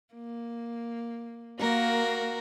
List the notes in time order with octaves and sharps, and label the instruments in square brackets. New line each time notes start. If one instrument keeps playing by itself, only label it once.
[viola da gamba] A#3
[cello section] A#3 [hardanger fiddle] F#4 A#4 [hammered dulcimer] F5 A#5